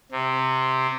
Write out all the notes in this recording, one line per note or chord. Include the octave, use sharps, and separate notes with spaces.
C3